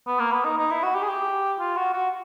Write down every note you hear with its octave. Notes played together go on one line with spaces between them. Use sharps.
B3
A#3
B3
D#4
D#4
E4
F#4
G4
G#4
G4
F4
F#4
F#4